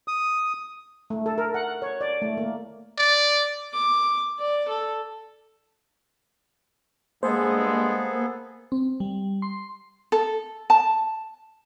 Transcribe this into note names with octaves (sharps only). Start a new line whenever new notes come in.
D#6
A3
A4
A#4
F#5
C#5
D5
A3
A#3
D5
D6
D5
A4
G2 G#3 A#3 B3 G#4 A4 C5
C4
G3
C6
A4
A5